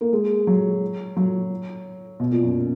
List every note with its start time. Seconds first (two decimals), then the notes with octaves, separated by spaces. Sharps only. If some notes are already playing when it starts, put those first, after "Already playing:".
0.01 A#3
0.13 G#3
0.47 F#3
1.16 F#3
2.20 B2
2.31 A#2
2.43 F#2